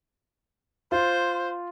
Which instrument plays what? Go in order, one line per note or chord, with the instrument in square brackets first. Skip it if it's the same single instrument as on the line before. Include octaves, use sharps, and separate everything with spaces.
[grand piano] F4 [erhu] C5